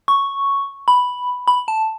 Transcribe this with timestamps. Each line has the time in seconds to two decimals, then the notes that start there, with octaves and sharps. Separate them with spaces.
0.08 C#6
0.88 B5
1.48 B5
1.68 A5